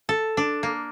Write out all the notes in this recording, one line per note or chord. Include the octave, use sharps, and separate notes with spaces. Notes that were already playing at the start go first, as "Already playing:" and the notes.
A4
D4
A#3